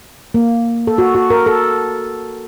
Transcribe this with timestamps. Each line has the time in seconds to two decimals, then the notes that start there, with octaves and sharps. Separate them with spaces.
0.34 A#3
0.87 A4
0.98 F#4
1.15 F#4
1.30 A#4
1.46 A4